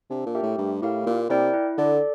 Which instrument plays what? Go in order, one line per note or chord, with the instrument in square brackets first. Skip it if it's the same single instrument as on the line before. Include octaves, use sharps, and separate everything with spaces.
[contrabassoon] C3 [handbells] D4
[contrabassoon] A#2
[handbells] G4 A#4 E5 G5
[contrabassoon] A2
[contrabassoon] G2 [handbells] A3
[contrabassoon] A2 [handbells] E4 G4 A#4 F5
[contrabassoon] A#2 [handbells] A#3
[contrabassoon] C3 [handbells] E4 A#4 D5 G5
[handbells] E4
[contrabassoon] D3 [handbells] A4 D5